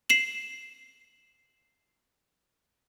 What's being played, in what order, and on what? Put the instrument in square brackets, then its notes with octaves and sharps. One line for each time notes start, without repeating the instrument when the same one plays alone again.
[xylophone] C7 E7 F#7